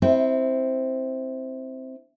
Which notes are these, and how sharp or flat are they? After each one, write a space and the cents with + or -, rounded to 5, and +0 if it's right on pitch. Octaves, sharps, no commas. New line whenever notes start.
C4 +0 E4 -20